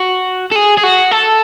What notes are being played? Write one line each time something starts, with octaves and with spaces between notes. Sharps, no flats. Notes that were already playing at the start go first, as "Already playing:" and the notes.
Already playing: F#4
A4
G#4
G#4
F#4
A4